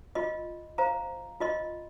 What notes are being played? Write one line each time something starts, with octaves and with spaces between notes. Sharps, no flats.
F4 D#5 C6
C5 F5 A#5
F4 D#5 C6